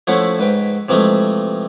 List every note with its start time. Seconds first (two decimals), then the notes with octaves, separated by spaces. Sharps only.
0.07 F3 A3 C#4 E4 F#5
0.39 G#2 B4 G5
0.89 C3 E3 F3 G#3 A3